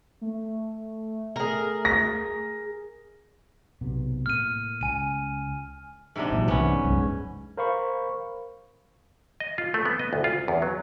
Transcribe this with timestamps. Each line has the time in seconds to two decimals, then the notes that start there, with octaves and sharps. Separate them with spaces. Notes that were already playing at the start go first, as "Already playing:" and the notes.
0.21 A3
1.36 G#4 A#4
1.85 A#6
3.81 B1 C3 B3
4.26 A2 A#3 F6 D#7
4.81 C#2 G#5 D#7
6.16 G#2 C3 D4
6.30 A1 A#2 F#3
6.48 C2 E3 B3 C#4
6.85 C2 F#2 G#3
7.57 A#4 C5 F5 B5 C#6
9.40 D#5
9.58 F4
9.74 A3
9.85 B3
9.99 D#5
10.13 D2
10.24 F4
10.48 E2
10.62 F#3